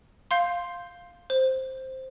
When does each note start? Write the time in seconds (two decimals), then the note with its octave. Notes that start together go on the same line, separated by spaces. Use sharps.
0.31 F5 C6 G6
1.30 C5